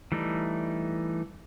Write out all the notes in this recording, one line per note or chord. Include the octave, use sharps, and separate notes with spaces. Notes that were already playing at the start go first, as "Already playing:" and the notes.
E3 G3 A3 D#4